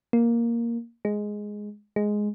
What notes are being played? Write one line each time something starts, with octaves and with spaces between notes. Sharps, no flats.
A#3
G#3
G#3